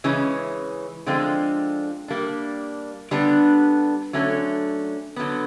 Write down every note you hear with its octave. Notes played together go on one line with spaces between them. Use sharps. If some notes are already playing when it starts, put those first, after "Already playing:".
C#3 E3 G#3 C#4
D3 F3 G#3 C4 F4
G3 A#3 D4
D3 G3 B3 D4
D3 F#3 A3 C#4
D3 F#3 B3